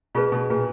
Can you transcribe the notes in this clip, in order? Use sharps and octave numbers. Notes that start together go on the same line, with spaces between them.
B2 F4 G#4 B4
B2
A#2 F4 G#4 B4